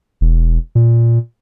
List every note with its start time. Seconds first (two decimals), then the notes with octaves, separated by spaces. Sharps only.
0.21 E1
0.75 A#2